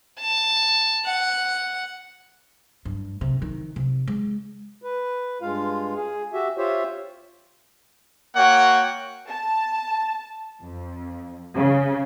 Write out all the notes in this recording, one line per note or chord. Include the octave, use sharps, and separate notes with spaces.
A5
F#5
G2
C3
D#3
C3
G#3
B4
G2 G#3 F4 F5
G#4
F#4 G4 E5
F4 G4 C5 C#5 E5
A#3 F#4 C#5 F#5 G5
A5
F2
C#3